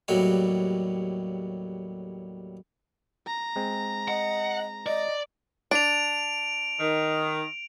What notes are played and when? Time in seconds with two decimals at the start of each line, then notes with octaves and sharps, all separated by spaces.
0.08 D#2 A2 F#3 G3 F#4 B5
3.27 A#5
3.56 G#3 C4
4.08 D#5 F#5
4.86 D5 D#5
5.71 D4 D7 F7
6.80 D#3